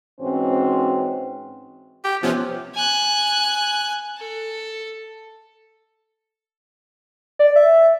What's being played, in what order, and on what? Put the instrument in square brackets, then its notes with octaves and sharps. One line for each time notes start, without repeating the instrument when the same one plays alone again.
[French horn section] G#2 E3 C4 C#4 F#4 C5
[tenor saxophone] G4
[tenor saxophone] C3 [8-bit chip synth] F3 B3 C#4
[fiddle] G#5 F#6
A4
[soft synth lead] D5
E5